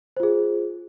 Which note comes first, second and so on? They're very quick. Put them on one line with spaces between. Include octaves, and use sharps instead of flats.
C5 F4 G#4